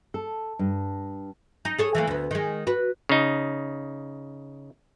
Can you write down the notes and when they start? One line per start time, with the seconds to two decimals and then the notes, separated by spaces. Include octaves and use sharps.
0.14 A4
0.59 G2
1.65 D#4
1.78 G#4 A4 C#5
1.95 E3 A3 A#3
2.07 D2 B3
2.31 D#3 G#3
2.67 F#4 B4
3.09 C#3 D#4